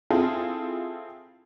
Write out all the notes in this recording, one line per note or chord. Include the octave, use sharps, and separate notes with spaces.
C4 E4 F4 G#4 A4